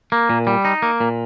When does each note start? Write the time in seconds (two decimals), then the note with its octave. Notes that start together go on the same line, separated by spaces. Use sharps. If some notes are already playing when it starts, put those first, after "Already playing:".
0.12 A#3
0.30 A#2
0.47 G3
0.65 D#4
0.82 A#3
1.00 A#2